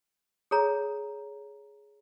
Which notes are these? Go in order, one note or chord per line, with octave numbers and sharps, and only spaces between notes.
G#4 A4 C#5 A#5